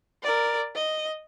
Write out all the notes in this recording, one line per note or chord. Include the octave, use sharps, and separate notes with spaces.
A#4 D5
D#5